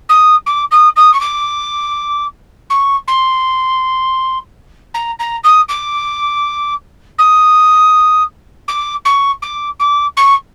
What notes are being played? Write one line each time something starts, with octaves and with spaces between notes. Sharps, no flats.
D#6
D6
D#6
D#6
C#6
D6
C#6
C6
A#5
A#5
D#6
D6
D#6
D6
C#6
D6
D6
C#6